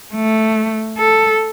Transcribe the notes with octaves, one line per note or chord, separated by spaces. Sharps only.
A3
A4